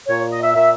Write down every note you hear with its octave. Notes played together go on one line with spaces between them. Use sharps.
A#2 C#5
D#5
E5
A#2 E5